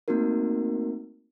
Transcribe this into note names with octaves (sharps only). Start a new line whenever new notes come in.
A3 A#3 C4 D#4 F#4 A#4